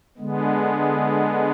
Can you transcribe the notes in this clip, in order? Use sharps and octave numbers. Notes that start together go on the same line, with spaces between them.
D3 G#3 B3